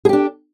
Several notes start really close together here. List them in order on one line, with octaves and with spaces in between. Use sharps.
G#4 G4 D4